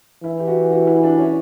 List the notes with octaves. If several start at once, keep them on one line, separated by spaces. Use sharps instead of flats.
E3 E4
G4
F#4
F#4
E4
D4
C#4